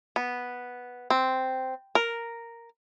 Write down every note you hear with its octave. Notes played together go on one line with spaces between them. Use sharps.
B3
C4
A#4